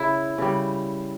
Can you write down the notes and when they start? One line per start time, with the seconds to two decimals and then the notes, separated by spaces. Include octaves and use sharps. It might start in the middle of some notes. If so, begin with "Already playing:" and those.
Already playing: C#3 E4
0.38 C#3 G3